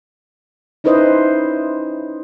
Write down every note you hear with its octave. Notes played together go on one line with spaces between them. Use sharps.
C#4 D#4 E4 B4 C5 D#5